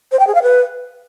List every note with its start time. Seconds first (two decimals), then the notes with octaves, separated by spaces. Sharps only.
0.12 C5
0.19 G5
0.27 G#4
0.35 F5
0.42 B4